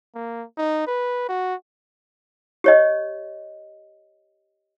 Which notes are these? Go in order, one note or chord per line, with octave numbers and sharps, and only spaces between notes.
A#3
D#4
B4
F#4
G4 C#5 D#5